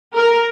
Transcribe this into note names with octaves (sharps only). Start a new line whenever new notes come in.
A#4